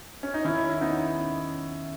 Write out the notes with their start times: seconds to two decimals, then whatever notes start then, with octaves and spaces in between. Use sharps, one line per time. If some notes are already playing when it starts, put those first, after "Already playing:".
0.23 C#4
0.34 D#4
0.45 D#3 C#4 E4
0.69 E4
0.81 B3 C#4 D#4